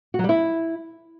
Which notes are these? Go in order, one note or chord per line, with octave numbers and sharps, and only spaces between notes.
F#4
F#3
G3
E4